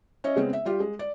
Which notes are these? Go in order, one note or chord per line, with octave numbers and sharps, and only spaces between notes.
C#4 C#5 D#5 E5
C#3 G#3 B3 C4
E5
G3 F4 G4
G#3
D5